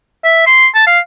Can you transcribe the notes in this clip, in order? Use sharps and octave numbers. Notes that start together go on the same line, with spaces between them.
E5
C6
A5
F5